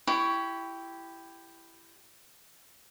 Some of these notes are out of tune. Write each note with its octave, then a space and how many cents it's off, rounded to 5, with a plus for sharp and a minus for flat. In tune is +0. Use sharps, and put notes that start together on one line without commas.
E4 +15 G4 +0 C#6 +20